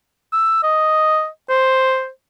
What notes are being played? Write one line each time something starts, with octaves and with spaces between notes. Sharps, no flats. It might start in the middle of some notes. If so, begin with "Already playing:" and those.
E6
D#5
C5